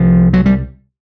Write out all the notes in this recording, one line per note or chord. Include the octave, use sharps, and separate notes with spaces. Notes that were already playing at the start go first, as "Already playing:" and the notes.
Already playing: C2 C3 F3
F#3
G3